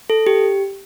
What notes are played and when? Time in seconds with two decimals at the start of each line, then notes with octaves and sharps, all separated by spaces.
0.10 A4
0.27 G4